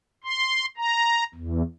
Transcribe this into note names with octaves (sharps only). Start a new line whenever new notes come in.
C6
A#5
E2